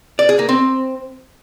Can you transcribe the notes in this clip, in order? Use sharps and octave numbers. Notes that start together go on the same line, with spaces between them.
D5
G#4
A#3
C4